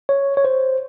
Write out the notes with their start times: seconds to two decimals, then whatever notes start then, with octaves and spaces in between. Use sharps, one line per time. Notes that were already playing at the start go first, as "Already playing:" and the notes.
0.09 C#5
0.37 C#5
0.45 C5